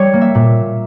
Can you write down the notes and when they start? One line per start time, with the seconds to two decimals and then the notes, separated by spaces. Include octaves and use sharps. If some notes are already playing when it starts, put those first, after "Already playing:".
Already playing: G3 C#5
0.13 A#3
0.21 E5
0.35 A#2